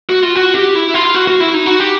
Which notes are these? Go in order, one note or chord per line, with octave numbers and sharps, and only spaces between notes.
F#4
F4
F#4
G4
E4
F4
F#4
F#4
E4
D#4
F#4
G4